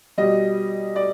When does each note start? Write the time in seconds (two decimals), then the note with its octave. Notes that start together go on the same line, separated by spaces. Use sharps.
0.18 B2 G3 D#5
0.96 D5